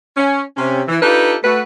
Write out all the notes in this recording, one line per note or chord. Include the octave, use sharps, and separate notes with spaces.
C#4
C3 C#4
E3
D4 D#4 F4 G4 A4 B4
A3 F#4 B4